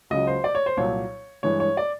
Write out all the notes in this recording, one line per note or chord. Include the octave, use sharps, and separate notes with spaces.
C#2 C#3 F#3 D#5
C5
D5
C#5
C5
C2 A#2 F#3 C#5
G2 E3 G#3 C#5
C#5
D5